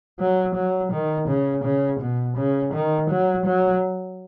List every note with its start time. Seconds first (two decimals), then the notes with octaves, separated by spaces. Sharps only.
0.20 F#3
0.55 F#3
0.92 D#3
1.29 C#3
1.64 C#3
2.00 B2
2.37 C#3
2.74 D#3
3.10 F#3
3.46 F#3